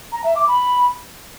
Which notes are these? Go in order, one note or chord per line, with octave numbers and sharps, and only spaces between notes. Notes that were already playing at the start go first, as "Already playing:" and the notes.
A#5
E5
D6
B5